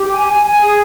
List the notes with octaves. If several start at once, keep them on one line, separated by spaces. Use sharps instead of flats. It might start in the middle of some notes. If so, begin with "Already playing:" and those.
Already playing: G4
G#5
G#5
G#5
G#4